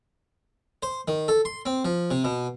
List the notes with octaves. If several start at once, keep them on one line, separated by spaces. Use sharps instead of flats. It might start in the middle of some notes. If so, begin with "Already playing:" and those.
C5
D#3
A4
C6
C4
F3
C3
B2